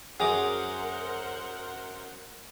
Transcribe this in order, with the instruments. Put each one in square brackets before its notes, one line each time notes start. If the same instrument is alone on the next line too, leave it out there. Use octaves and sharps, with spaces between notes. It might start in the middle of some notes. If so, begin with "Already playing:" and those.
[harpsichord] F#2 A#5 D6 [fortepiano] G#4 [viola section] A#4 C5 F#5